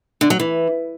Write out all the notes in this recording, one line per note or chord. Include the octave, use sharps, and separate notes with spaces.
D3
F#3
E3